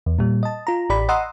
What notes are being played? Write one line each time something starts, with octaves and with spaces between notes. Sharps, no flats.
E2
A#2 G3
D#5 A5
F4 A#5
A1 G4 D5 B5
D#5 F#5 A#5 C6 D#6 E6